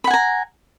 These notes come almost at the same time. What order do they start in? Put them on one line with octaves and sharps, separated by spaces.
B5 F#5 G#5 A#5